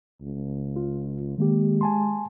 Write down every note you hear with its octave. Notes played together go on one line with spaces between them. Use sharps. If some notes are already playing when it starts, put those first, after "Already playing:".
C#2
F4
D#3 G#3 A#3 G4
G#5 A5 C6